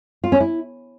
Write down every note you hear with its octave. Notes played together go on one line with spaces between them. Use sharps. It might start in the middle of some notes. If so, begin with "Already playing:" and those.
F4
C#4
E4